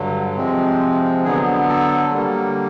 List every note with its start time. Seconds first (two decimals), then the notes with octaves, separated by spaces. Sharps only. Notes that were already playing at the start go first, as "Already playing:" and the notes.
Already playing: G2 D3 F#3
0.37 C3 F3 G#3 C4
1.24 D3 F#3 B3 G#4
1.68 A4
2.13 D3 G3 A#3